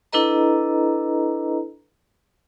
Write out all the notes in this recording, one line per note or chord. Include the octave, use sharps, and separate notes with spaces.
D4 E4 A4 B4 D#5 A#5